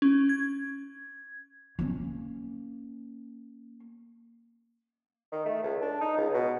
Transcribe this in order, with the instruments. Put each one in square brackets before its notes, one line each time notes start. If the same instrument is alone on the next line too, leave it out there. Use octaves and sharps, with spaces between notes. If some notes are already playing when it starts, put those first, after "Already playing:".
[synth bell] C#4
G#6
[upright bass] A#3 C#4
[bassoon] D#3
A3
C#2
D4
D#4
C#2
B2